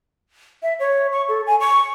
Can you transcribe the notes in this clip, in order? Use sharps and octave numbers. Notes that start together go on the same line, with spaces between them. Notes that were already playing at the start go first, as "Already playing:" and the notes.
E5
C#5
C#6
A4
G#5
C#6